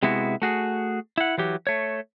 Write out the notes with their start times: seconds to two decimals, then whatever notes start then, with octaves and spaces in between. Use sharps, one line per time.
0.03 C3 G#3 B3 E4 F#4
0.42 A3 F#4 G#4
1.18 E4 F#5
1.38 E3 F#3 G4
1.67 A3 C#5